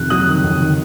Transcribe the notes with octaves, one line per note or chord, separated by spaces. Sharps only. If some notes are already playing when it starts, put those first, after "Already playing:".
Already playing: F2 C3 D#3 F#6
F#3 D#6 F#6
D#3
F2
D#3